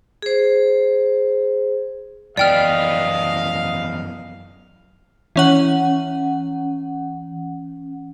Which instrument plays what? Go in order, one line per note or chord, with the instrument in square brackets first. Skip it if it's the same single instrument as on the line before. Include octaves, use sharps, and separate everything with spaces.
[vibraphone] G#4 C5
[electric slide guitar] F#2 E3 B3 [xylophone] D5 G5 F6 [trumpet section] D#5 [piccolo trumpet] F5
[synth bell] E3 C#4 F#5